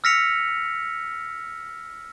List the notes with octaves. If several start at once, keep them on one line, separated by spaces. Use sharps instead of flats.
E6 F6 A#6 B6 C#7 F7